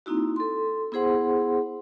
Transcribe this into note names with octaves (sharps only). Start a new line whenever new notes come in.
A#3 C4 D#4 E4 F#4
A4 C6
B3 E4 G#4 C5 F#5 C6